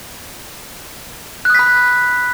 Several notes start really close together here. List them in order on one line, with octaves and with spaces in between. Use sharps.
F#6 D#6 B6 B5